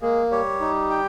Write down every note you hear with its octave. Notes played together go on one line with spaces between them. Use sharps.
G#3 A#3 G#4
G3 G4 C#5
D#4
G5